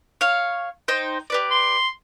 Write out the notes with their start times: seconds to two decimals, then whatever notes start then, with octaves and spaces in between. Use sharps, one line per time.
0.21 C#5 F5
0.88 D#4 C5 G5
1.30 G4 B4 D5
1.50 C6